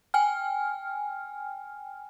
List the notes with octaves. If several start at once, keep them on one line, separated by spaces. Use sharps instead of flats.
G5 G#5 F6